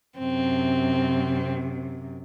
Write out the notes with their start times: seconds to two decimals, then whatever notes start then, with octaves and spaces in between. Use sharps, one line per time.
0.18 F#2 C3 C4